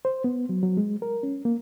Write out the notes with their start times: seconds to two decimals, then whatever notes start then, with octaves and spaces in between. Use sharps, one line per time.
0.05 C5
0.24 B3
0.49 F#3
0.63 F#3
0.77 G#3
1.02 A#4
1.23 C#4
1.45 A#3